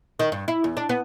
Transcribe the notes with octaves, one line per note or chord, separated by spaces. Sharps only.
D#3
G2
E4
E2
D4
B3